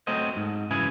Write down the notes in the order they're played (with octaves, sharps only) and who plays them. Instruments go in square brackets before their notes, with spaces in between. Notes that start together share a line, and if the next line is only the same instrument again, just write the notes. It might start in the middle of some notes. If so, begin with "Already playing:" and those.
[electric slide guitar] F#3 A3 C4 C5 D#5
G#2
F#2 C#3 E3 E4 G#4 G#5